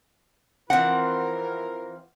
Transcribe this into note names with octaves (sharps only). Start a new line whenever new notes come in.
E3 F3 C4 E4 A#4 F#5